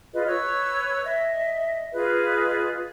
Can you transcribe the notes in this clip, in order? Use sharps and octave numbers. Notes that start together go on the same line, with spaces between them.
F4 G#4 B4 D#5
B4 C#5 C#6 E6
D#5 E5
F4 G#4 B4 D#5